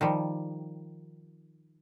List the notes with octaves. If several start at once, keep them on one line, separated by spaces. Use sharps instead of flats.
D#3 F3 G3